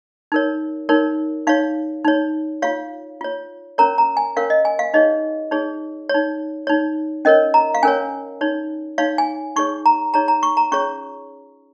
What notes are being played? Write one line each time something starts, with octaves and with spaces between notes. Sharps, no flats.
D#4 A#4 C#5
D#4 A#4 C#5
D#4 C#5 F5
D#4 C#5
F4 C#5 F5
F4 C#5
C#4 A#4 C#5 A#5
A#5
G#5
C#4 A#4 C#5 F5
D#5
G#5
F5
D#4 G#4 C#5 D#5
D#4 G#4 C#5
C#5
D#4
D#4 C#5
C#4 A#4 C#5 D#5
A#5
F5
C#4 A#4 C#5 G#5
D#4 C#5
D#4 C#5 F5
G#5
D#4 G#4 C#5 C#6
A#5
D#4 G#4 C#5 A#5
A#5
C#6
A#5
C#4 F4 G#4 C#5 C#6